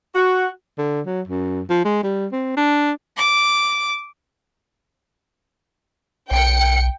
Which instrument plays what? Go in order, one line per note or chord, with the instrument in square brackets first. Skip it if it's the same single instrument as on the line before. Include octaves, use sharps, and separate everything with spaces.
[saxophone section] F#4
[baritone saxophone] D3
F#3
F#2
F3
G#3
G3
C4
D4
[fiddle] D6
[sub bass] B1 [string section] G5 C#7